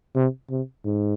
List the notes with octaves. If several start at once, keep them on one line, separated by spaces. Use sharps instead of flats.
C3
C3
G#2